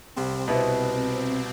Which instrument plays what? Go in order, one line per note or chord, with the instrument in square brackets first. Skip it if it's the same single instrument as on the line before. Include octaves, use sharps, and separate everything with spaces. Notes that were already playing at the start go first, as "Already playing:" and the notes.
[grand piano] C2 [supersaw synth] C4
[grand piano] B2 B3 E4